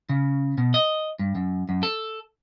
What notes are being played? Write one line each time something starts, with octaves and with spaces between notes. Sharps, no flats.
C#3
B2
D#5
G2
F#2
F#2
A4